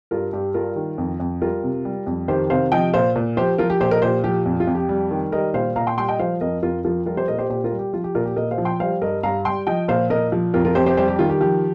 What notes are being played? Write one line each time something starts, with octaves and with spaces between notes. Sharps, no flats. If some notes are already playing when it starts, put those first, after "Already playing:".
G2 F4 A#4
G2 G4
G3 F4 A#4
D#3
F2
F2
G3 F4 A#4
C3
G3
F2
D#3 G4 C5
C3 C5 F5
F3 D#5 G5
A#2 C5 F5
A#2
F3 G4 C5
F3 F4 A#4
G4
A#2 G4 C5
A#4 D#5
A#2 G4 C5
F3 G4
F2
F4
F2
G4
G3
D#3
G3 A#4 D#5
A#2 C5 F5
A#2 F5 A#5
G5 C6
G3 G5 C6
D#5 G5
F3 C5 F5
F2 A#4 D#5
F2 F4 A#4
F3 F4 A#4
G3 F4 A#4
G4 C5
A#2 A#4 D#5
G4 C5
A#2 G4 C5
F4 A#4
G3
G4
F3 F4
G4
A#2 F4 A#4
G4
A#2 A#4 D#5
C5 F5
F3
G5 C6
G3 C5 F5
G2 A#4 D#5
G2 F5 A#5
G3 G5 C6
F3 D#5 G5
A#2 C5 F5
A#2 A#4 D#5
F3
F2 F4 A#4
F4 A#4
F2 G4 C5
G4 C5
G3 G4 C5
G4
D#3 F4
G4
F3 G4